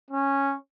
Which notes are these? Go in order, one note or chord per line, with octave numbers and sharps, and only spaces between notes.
C#4